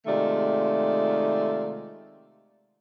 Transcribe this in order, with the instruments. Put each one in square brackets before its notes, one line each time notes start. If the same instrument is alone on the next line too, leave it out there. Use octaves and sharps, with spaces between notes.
[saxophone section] C3 D#3 G#3 A3 F4 D5